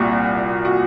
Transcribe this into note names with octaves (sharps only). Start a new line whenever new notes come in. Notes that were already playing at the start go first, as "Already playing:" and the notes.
Already playing: C2 A#2 F#4
F#4